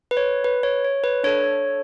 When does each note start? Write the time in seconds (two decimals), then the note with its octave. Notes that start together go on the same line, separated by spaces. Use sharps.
0.11 B4
0.17 C#5
0.44 B4
0.63 C#5
0.84 C#5
1.04 B4
1.23 D4 A4 C#5